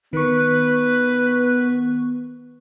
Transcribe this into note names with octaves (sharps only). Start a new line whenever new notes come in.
D#3 B3 B4 C#6